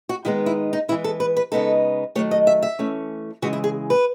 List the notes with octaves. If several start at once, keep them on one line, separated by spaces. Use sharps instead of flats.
F#4
D#3 G#3 B3 D#4 E4
E4
D#4
E3 G#3 B3 E4
A4
B4
B4
C#3 G#3 B3 D#4 A4
D#3 F#3 A3 C#5
D#5
E5
E5
E3 A3 C#4
C#3 E3 G#3 F#4
E4
G#4
B4